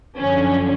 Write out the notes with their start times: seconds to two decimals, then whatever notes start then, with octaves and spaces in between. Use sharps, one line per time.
0.18 F#2 D3 F3 C#4